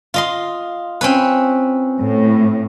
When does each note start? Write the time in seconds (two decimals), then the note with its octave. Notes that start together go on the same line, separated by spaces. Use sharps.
0.14 F4 D#5 C6
1.01 C4 C#4 B4
2.00 A2